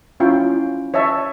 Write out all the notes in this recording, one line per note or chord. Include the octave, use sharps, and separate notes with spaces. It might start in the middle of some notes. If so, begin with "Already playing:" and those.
C#4 E4 F4 G5
C#5 D#5 E5 A5 C#6